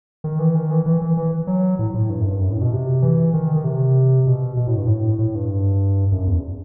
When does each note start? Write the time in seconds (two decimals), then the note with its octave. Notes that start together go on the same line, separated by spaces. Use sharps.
0.24 D#3
0.39 E3
0.55 D#3
0.71 E3
0.86 E3
1.02 E3
1.17 E3
1.47 F#3
1.79 A2
1.94 A2
2.10 G2
2.21 F#2
2.25 G2
2.40 F#2
2.51 A2
2.61 B2
2.72 C3
3.02 E3
3.34 D#3
3.56 D#3
3.64 C3
4.27 B2
4.57 B2
4.67 A2
4.77 G2
4.87 A2
5.19 A2
5.35 G2
6.12 F#2
6.27 E2